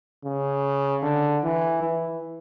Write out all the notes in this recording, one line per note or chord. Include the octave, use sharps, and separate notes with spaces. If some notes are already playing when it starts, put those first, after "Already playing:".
C#3
D3
E3
E3